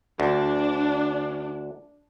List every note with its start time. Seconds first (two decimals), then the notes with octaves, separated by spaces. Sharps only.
0.20 D2 D4